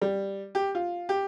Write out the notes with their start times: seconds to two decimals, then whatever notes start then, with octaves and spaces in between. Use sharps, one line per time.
0.02 G3
0.55 G4
0.75 F4
1.09 G4